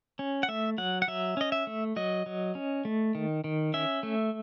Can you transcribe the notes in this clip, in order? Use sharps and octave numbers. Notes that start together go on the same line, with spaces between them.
C#4
F#5
A3 E5
F#3 F#5
F#5
F#3 E5
C#4 D#5
E5
A3
F#3 D#5
F#3
C#4
A3
D#3
D#3
C#4 E5
A3